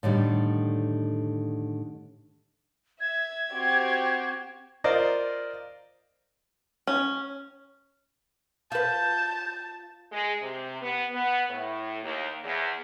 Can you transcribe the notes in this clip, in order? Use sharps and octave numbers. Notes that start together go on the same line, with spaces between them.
A2 D3 D#3 G3
E5 G#6
C4 F#4 G4
F4 A#4 C5 D5 D#5
C#4
F4 B4 A5 G6
G#3
C3
B3
B3
A2
D#2
E2